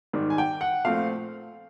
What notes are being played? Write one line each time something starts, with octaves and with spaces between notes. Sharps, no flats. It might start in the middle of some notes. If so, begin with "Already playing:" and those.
G#2 D#3 G3
G#5
G5
F#5
A#2 F3 A3 C4 F5